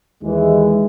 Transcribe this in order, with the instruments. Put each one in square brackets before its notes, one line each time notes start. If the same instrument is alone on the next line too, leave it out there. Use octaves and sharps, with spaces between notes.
[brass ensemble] D#2 E3 G#3